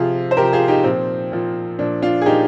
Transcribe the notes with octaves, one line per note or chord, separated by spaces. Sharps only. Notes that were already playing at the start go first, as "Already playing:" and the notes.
Already playing: C3 F3 F4 G#4
C5
C3 F3 G4 A#4
F4 G#4
D#4 G4
A#2 F3 C4
A#2 F3
A#2 F3 D4
D4 F4
G#4
A#2 F3 D#4 G4